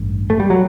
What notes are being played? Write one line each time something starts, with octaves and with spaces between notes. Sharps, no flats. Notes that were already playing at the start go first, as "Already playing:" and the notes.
Already playing: A1 G2
A3
G3
F#3